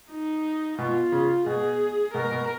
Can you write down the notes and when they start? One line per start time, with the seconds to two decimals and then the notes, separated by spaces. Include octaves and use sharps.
0.11 D#4
0.78 B2 F4
1.12 C#3
1.46 B2 G#4
2.14 B2 A#4
2.31 B2